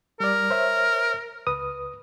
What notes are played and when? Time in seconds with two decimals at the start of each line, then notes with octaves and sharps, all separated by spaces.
0.20 G3 A#4 D5
0.50 C5 C#5 E5
1.47 C#2 B4 D#6